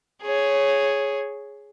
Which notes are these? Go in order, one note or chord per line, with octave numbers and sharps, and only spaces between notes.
G#4 C#5